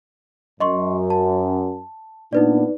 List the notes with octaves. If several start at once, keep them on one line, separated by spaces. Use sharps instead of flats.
F#2 D#5 C6 C#6
A5
A#2 B3 D4 D#4 B4 D5